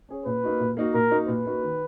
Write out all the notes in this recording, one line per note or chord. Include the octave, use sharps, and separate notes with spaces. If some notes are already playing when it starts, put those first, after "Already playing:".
C#4 G#4 C#5
A#2 B4
A#3 D#4 F#4
A#2
A#3 D#4 F#4
A#2 A#4
A#3 D#4 F#4
A#2 B4
A#3 D#4 F#4
D#3